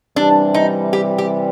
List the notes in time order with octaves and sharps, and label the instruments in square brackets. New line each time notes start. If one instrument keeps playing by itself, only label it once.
[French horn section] C3 E3 G3 [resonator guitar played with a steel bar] D4
[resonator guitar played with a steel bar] D#4
G4
G4